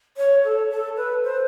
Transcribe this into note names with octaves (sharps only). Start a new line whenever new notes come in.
C#5
A4
A4
B4
C5